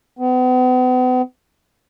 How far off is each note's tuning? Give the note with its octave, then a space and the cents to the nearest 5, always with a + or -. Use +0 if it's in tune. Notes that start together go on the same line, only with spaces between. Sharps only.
B3 +40